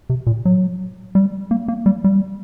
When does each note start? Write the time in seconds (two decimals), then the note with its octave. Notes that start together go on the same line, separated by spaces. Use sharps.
0.10 C3
0.27 A#2
0.45 F#3
1.15 G3
1.51 A#3
1.68 A#3
1.86 G3
2.04 G3